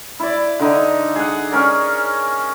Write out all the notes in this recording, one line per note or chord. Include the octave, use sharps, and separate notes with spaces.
E4 D5
D3 D#4
G#4 F#5
C#4 A#4 D5